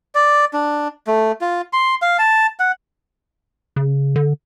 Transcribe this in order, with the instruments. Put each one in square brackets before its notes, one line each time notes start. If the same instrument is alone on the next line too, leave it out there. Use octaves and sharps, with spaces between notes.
[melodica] D5
D4
A3
F4
C6
F5
A5
F#5
[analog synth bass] C#3
D3